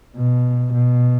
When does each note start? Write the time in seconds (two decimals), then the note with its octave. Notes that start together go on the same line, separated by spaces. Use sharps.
0.17 B2
0.73 B2